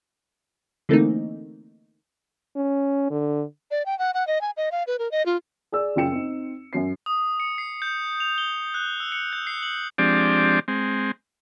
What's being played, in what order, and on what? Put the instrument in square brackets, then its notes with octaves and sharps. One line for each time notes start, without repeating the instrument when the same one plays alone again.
[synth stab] D3 E3 A3 A#3 C4 D#4
[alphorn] C#4
D3
[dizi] D5
G5
F#5
F#5
D#5
G#5
D#5
F5
B4
A#4
D#5
F4
[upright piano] G#4 D5 E6
F#1 C#3 F4 G5 C#7 E7
C4 D#4
F#2 F#3 C7
[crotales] D#6
C#7
C7
G6
F7
G7
F#6
E6
C#7
G6
C7
F#7
[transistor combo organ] F3 G#3 C4 D4 G4 D5
G#3 C4